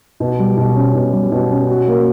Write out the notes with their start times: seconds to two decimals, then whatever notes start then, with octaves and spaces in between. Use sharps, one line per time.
0.20 B2
0.39 G3
0.57 B2
0.76 C#4
0.95 B2
1.12 G3
1.32 B2
1.51 C#4
1.68 F#4
1.88 A#3